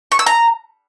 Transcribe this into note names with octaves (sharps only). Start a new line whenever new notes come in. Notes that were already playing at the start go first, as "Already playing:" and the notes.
C#6
E6
A#5